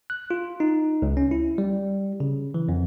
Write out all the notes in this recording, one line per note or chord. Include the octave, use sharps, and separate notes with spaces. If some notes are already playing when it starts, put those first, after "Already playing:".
F#6
F4
D#4
C#2
C#4
E4
G3
C#3
E3
F2